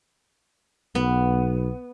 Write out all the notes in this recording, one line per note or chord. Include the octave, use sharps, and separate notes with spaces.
B1 B3